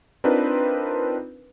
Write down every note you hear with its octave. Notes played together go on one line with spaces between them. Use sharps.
C4 D4 D#4 F4 A#4 B4